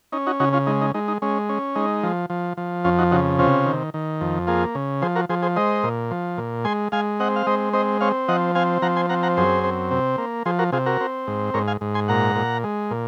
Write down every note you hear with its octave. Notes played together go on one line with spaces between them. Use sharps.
C#4 D#4
D#4 F#4
C#3 D#4 F#4
C#4 F4
G#3 D#4
D#4
G#3 D#4
D#4
G#3 C#4
C#4
G#3 D#4
F3
F3
F3
F2 C#4 F4
D#4 F#4
C#3 D#4 F#4
C3 C#4 F4
D#3
D#3
F2
A#3 F4 G#4
C#3
F3 G#4 C5
F#4 A#4
F3 G#4 C5
G#4 C5
G#3 C5 D#5
A#2
F3
A#2
G#3 G#5 C6
G#3 F5 G#5
C4 D#5 F#5
F5
G#3 C5 D#5
C4 C5 D#5
C4 C#5 F5
F3 D#5 F#5
C4 F5 G#5
F3 F#5 A#5
G#5 C6
C4 F#5 A#5
F#5 A#5
F#2 G#4 C5
C4
C3
A#3
F3 G#4 C5
F#4 A#4
C3 F4 G#4
F#4 A#4
C4
G#2
G#2 A#4 C#5
F5 G#5
G#2
G#5 C6
A#2 F#5 A#5
A#2
G#3
A#2